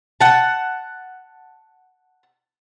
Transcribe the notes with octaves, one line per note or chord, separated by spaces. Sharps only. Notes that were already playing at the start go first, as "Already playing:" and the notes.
F#5 A5